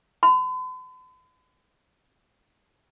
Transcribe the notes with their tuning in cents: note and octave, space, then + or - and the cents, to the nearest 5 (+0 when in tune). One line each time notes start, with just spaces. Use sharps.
B5 +45